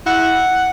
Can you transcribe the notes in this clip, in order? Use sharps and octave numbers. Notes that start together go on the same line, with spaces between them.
E4 F#5